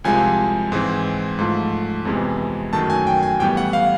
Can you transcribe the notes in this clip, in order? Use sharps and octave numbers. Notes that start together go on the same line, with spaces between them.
C2 C3 F3 G#3 G#5
G#2 E3 G#3 C4
G#2 F3 A3
F2 C3 E3 G#3 B3
F#2 D#3 F#3 A3 A5
G#5
G5
G#5
A2 E3 G3 B3 G5
F#5
F5